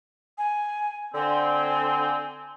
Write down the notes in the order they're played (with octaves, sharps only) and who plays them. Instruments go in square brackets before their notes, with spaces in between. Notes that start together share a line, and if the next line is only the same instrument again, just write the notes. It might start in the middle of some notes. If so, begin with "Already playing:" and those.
[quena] G#5
[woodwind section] D3 C4 [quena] G#5